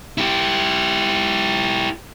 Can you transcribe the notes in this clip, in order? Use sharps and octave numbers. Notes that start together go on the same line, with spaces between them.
E4 G4